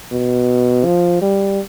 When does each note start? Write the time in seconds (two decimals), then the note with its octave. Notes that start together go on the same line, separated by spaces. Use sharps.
0.11 B2
0.84 F3
1.21 G3